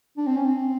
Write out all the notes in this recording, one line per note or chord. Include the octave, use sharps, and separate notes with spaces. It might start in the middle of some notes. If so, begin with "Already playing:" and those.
D4
C4
C#4
C4